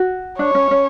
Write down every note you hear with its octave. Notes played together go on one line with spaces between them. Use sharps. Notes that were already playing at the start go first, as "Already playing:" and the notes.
Already playing: F#4
D4 C#5
C#4
C#4